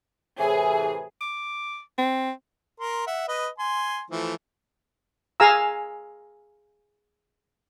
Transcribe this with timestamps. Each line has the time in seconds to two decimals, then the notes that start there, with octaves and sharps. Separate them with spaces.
0.39 A2 C3 E3 G#4 G#5
1.21 D6
1.98 C4
2.80 A#4 C6
3.07 E5 F#5
3.28 B4 D#5
3.58 G#5 C6
4.11 E3 F3 A3
5.40 G#4 F5 G#5 A#5 E6